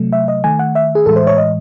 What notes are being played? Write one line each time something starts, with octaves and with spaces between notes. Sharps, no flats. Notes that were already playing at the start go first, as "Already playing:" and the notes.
Already playing: C3 F#3 A3
E5
D#5
D#3 A3 G#5
F#5
E5
G#4
A2 E3 G#3 A4
C5
C#5
D#5